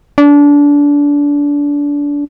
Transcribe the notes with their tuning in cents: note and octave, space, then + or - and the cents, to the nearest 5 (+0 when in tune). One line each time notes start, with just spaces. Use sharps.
D4 -25